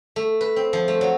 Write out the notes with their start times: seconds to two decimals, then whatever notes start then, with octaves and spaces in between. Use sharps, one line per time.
0.16 A3
0.41 B4
0.56 C4
0.73 F3
0.88 A3
1.01 F#3